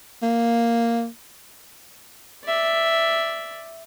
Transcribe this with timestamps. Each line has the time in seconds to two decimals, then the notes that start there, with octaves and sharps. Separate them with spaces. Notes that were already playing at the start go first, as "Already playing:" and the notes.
0.22 A#3
2.45 D5 E5